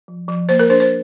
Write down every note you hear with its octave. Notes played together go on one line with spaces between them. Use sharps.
F3
F3
A#3 C5
A#4
D4 C5
C5